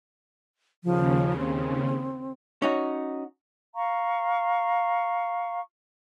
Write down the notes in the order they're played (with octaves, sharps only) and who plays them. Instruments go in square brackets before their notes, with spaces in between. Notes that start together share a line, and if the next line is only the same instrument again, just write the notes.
[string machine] D#2 C#3 [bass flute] F3
[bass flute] C4
[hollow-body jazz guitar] C#4 D#4 F#4
[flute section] F5 A#5 C#6